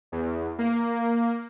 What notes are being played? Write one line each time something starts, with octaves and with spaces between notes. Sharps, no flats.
E2
A#3